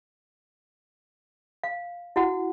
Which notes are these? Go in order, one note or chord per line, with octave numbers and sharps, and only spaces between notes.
F5
E4 F#4 F#5